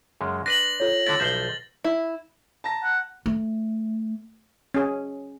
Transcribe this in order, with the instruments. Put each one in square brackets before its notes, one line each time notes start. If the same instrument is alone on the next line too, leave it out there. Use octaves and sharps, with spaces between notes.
[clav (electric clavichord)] F#2 C#3 G#3 [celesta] C6
[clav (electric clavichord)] D4 B4 [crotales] A#6 F#7
[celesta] F4 A4 C#5
[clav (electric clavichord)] D3 A3 E4 [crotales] A6
[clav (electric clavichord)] B1 F3 E5 [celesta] G6 C7 G7
[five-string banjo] E4
[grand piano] A5 A#5 A#6
[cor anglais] F#5
[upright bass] A3
[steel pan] C#4 G#4